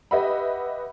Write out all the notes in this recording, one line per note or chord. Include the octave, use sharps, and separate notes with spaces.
G4 B4 D#5 E5 F#5 B5